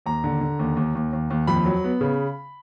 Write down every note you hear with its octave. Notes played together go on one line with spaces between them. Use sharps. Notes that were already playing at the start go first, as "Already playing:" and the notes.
D#2 A#5
D3
D3
D#2
D#2
D#2
D#2
D#2
F2 B5
F#3
B3
C#3